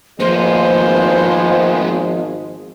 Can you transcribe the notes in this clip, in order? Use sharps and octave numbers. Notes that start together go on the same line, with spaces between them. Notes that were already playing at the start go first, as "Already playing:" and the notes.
G#1 F3 G#3 A#3 B3 C5